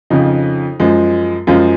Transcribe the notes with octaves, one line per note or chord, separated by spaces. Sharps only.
F2 C#3 F3 D#4
F#2 F3 G#3
F#2 F3 G#3 F4